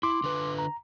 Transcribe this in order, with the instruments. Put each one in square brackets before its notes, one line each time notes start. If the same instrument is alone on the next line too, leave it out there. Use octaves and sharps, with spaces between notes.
[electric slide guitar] E4 [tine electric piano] C6 D6
[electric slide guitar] D3 B4
[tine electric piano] A#5